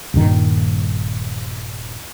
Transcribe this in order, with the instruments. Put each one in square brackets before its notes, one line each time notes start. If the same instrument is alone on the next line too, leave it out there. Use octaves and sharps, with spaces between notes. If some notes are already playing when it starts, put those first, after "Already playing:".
[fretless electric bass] D#1 G2 D#3